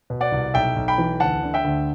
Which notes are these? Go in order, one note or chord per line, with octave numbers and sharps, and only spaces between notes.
B2
D5 F#5
C2
B1 E5 G5
B1
G5 B5
E3
D2 F#5 A5
D3
E5 G5
D2